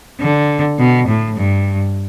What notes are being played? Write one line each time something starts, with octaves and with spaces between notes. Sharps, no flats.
D3
B2
A2
G2